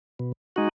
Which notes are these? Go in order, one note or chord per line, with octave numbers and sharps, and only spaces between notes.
B2
G#3 D#4 F#4